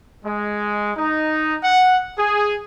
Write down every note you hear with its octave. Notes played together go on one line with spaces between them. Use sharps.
G#3
D#4
F#5
G#4